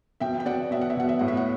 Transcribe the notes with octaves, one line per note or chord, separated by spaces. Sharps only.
B2 E5 G5
G5
B2 D5 F#5
B2 E5
F#5
E5
B2 F#5
E5
A2 F#5
E5
F#5